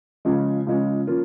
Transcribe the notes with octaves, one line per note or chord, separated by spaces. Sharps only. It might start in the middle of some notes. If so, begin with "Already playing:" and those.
C#2 C#3 F3 G#3 C#4
C#2 C#3 F3 G#3 C#4
F3 A#3 C#4 F4